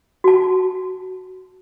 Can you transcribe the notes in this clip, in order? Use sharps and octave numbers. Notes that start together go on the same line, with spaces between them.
F#4 A5